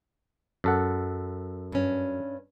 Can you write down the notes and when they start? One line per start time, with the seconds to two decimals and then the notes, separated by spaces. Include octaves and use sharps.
0.64 F#2 A4 F#5
1.72 G2 C#4